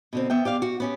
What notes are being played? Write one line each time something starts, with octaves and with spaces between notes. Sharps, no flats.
B2 D3 C4
B3 E5 G5
G4 D5 F5
F#4
B3 C#4 G4